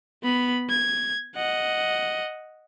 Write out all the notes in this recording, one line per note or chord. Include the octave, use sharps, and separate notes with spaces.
B3 B5
G#6
D#5 F#5